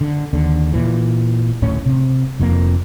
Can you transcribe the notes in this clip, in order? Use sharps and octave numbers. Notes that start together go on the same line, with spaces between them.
D3
D#2 D3
A#2 E3
D1 A2 C#4
C3
F1 F2 C#3 A#3